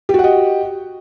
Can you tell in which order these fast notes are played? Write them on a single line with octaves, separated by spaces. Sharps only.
G4 F#4 F#5 D#5